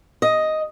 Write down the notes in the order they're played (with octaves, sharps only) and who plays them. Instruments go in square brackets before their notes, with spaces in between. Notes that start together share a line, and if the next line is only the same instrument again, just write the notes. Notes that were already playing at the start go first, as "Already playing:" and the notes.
[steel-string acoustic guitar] D#5